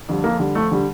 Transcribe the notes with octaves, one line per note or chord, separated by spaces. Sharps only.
F2 D3 G3
F2 A#3
D3 G3
F2 A3
D3 G3